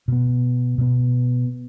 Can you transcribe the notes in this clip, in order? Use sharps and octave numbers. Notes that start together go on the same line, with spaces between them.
B2 B3
B2 B3